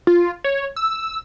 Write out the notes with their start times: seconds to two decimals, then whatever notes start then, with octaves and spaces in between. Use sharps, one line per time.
0.07 F4
0.44 C#5
0.76 E6